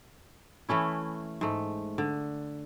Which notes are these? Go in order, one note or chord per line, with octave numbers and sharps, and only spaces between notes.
E3 A3 C#4 E4
G#2 A3
D3